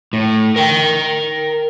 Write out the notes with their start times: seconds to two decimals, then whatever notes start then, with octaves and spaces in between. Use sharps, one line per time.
0.13 A2
0.56 A#4 G5